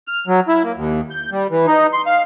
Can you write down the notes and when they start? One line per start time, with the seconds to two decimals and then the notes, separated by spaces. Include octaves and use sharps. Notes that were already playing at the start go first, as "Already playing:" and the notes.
0.08 F6
0.27 F#3
0.48 E4
0.64 A#3
0.76 D#2
1.11 G6
1.31 G3
1.50 E3
1.67 D#4
1.93 C6
2.06 F5